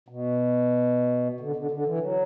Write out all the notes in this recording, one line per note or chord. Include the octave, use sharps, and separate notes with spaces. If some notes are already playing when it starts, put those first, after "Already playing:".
B2
D3
D3
D3
E3
F#3